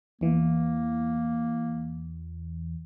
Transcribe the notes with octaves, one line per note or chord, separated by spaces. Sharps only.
E2 E3 A#3